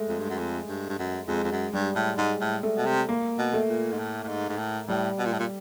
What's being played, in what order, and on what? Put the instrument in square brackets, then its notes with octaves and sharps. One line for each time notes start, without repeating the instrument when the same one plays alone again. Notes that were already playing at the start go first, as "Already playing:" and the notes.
Already playing: [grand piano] G#3 A3
[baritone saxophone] F2
G2
F#2
F2
G2
G2
F#2
[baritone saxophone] F2 [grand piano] G#3
[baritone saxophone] F2
F#2
[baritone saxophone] G2 [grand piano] G3
[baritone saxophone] A2
[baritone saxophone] G#2 [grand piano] G#3
[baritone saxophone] A2
[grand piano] A3
[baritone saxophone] B2
C3
[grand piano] A#3
[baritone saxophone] B2
[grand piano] A3
[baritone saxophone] A#2
G#2
A2
A2
G#2
G#2
A2
[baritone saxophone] A2 [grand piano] G3
[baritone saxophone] B2
A#2
A2
A#2